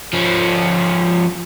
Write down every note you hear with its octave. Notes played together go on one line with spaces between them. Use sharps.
F3 C#4